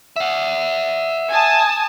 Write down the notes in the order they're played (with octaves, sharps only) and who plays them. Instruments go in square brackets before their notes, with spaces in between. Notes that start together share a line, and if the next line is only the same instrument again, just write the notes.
[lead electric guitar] E5 F#5
[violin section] G#5 A5 D#6